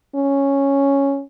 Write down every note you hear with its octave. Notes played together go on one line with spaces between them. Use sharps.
C#4